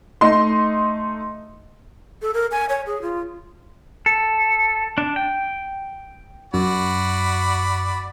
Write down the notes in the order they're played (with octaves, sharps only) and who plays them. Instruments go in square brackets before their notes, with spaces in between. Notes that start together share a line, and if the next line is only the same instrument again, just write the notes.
[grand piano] A3 D#4 D#5 C6
[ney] A4
A#4
G#5
C#5
G#4
F4
[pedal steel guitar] A4
D4
G5
[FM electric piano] F#2 [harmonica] F#4 D5 B5